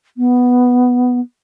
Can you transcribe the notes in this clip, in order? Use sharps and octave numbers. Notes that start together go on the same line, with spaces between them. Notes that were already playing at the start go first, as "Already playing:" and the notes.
B3